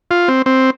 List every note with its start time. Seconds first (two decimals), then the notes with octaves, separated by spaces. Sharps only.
0.11 F4
0.28 C4
0.46 C4